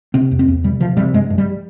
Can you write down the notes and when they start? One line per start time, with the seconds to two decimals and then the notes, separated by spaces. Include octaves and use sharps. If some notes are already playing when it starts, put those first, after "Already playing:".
0.14 C3 C4
0.31 E2
0.39 C4
0.48 E2
0.64 C3 G3
0.80 C3 F3
0.97 C3 G3
1.13 G2 G#3
1.30 G2
1.38 G3